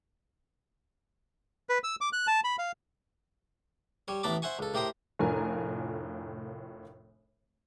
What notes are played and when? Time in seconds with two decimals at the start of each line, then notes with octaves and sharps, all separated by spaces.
1.69 B4
1.84 E6
2.01 D6
2.13 F#6
2.27 A5
2.44 B5
2.59 F5
4.08 G3 C#5
4.23 A1 A2 B3 A5 B5 D6
4.42 C5 E5 F#5 G#5 C#6
4.59 C#2 A4
4.74 A2 G4 A#4 C5 D#6
5.19 F1 A2 D4 F4 A#4 G#5